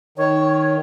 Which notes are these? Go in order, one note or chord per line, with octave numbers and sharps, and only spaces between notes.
D#3 C#5